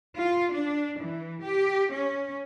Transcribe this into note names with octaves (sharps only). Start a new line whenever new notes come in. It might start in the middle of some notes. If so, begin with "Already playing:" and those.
F4
D4
E3
G4
C#4